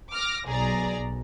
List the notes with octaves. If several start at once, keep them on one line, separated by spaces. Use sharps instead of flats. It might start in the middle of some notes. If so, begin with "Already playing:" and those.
D6 F6 A#6
B1 B2 G#4 D5 A#5